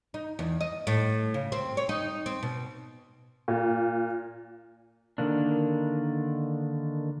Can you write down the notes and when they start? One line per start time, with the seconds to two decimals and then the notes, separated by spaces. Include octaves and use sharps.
0.14 D#4
0.39 E2
0.61 D#5
0.87 A2
1.34 C#3
1.52 C4
1.77 C#5
1.89 D#4
2.26 C4
2.43 B2
3.48 A#2
5.18 D3 D#3 A#3 D4